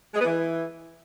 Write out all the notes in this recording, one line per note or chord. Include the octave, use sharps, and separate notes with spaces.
G#3
B3
E3